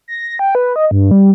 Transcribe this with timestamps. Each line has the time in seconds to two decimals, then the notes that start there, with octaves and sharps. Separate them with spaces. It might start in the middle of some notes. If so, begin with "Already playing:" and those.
0.08 A#6
0.39 G5
0.55 B4
0.76 D#5
0.91 G2
1.11 G3